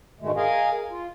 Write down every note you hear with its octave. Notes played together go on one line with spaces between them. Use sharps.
G#2 B2 D3 D#3 G#3 A3
G#4 A#4 D#5 F5 G#5
F4